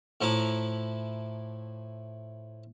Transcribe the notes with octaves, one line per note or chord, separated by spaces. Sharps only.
A2 F3 E4 A#5 D6